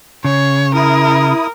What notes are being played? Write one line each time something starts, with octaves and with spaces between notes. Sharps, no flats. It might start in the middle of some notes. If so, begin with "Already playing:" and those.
C#3 C#5
E4 A#4 D#6